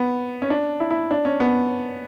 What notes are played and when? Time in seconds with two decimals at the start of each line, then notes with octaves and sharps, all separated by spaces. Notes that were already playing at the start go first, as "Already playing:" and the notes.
Already playing: B3
0.42 C#4
0.50 D4
0.80 E4
0.90 E4
1.11 D4
1.25 C#4
1.40 B3